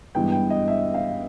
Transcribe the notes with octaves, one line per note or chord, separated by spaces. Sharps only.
G2 E3 G#3 B3 G5
G5
D#5
E5
F5